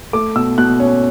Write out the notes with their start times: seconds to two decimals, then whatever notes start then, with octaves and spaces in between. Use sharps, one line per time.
0.13 A3 D6
0.36 B2 E6
0.58 B2 F#6
0.80 C#4